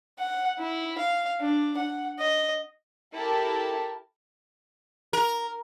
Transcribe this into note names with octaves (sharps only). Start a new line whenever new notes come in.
F#5
E4
F5
D4
F#5
D#5
E4 G4 A4 A#4 A5
A#4